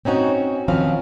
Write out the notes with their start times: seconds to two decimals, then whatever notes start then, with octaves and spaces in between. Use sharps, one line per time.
0.05 C4 C#4 D#4 F#4
0.68 D#3 F3 C4 C#4 B4 F5